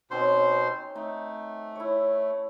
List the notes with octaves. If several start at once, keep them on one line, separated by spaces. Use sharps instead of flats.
B2 C4 C#4 D#4 C5 C6
A3 D#4
E4 C#5